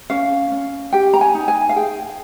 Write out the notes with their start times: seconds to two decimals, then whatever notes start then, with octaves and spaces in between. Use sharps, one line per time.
0.10 C#4 F5
0.52 C#4
0.92 G4 G5
1.14 A#5
1.21 G#5
1.35 D#4
1.48 G#5
1.69 F5
1.76 G#4 G5